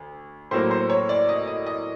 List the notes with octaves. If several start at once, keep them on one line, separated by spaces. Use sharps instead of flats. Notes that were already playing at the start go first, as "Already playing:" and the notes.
Already playing: D2
A2 F#3 A#3 C5
C5
C#5
D5
D#5
D#5
D#5